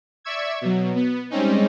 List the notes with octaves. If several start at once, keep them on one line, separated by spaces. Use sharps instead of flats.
D5 E5 C#6 E6 G#6
B2 F#3
B3
G3 G#3 C4 C#4 D#4